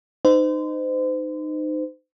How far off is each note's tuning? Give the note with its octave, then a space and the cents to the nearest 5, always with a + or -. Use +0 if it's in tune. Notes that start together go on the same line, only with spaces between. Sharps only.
D#4 -20 C5 -35